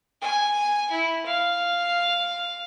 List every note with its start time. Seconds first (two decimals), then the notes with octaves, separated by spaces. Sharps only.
0.21 G#5
0.91 E4
1.26 F5